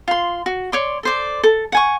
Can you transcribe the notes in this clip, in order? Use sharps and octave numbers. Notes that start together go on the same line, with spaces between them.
F4 C6
F#4
C#5 D5 C6
A4 C5 D5
A4
F#5 G#5 C#6